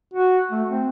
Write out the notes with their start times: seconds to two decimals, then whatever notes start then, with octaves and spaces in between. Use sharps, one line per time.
0.14 F#4
0.51 A3
0.69 C4